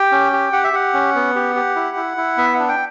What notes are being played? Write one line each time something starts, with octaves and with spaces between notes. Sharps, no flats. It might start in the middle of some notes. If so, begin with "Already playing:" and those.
Already playing: G4 G5
C#4
G4
G4 F#5
E5
G4 F#5
C#4
B3
G4
G4
E4
E4
E4
B3 E5
F#5
D4
G5